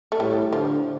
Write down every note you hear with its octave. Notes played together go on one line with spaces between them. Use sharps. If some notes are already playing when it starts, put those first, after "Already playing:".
A3
A2 G3
D3 F3